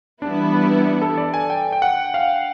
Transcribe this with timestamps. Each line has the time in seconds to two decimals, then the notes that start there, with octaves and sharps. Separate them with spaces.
0.22 E3 G3 B3 D4 E4
0.54 D4
1.01 A4
1.18 D5
1.34 G#5
1.50 G5
1.72 G5
1.82 F#5
2.14 F5